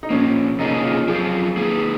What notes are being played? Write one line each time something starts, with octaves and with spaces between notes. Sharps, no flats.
D#4
A#2 F3 A#3 C#4
C3 F3 A#3 C#4 D#4 G#4
F4
F#2 F3 C4 F4 G#4
D#3 A#3 D#4 G#4